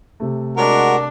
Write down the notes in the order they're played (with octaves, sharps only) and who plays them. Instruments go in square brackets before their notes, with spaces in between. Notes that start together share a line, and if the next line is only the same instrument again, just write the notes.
[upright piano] C3 A3
[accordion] G#3 F#4 F#5 [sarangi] D4 [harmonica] A#4